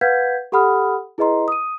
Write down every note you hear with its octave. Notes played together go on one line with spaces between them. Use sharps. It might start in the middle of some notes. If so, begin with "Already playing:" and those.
B4 F5 F#5 G6 G#6 B6
G4 A4 F#5 B5 D#6 F6
E4 G#4 B4 D#5 A#5 C6
D#6 D#7